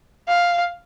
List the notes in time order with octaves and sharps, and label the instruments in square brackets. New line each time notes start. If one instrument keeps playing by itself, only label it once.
[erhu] F5